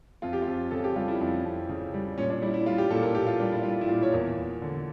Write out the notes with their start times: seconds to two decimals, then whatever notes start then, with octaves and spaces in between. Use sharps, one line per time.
0.22 F2 F4
0.33 G4
0.42 F4
0.47 F2
0.71 C#3 A4
0.84 G4
0.95 G3 F4
1.08 E4
1.21 F2
1.45 F2
1.69 C#3
1.94 G3
2.18 A#2 C#4
2.30 D4
2.42 G3 E4
2.54 E4
2.66 G3 F4
2.78 G4
2.90 A#2 A4
3.03 A#4
3.15 A#2 G4
3.27 F4
3.40 G3 D4
3.52 E4
3.63 G3 F4
3.81 E4
3.88 A#2 F4
4.03 C#5
4.12 E2 A#4
4.36 E2
4.62 D3